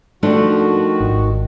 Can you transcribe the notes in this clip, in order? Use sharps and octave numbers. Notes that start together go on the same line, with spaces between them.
D#3 F3 A3 D4 F#4
G#1 G#2